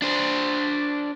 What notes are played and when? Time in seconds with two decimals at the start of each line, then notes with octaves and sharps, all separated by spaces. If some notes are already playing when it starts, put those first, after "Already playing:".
0.02 D4 C5